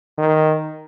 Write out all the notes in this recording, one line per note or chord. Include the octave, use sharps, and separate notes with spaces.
D#3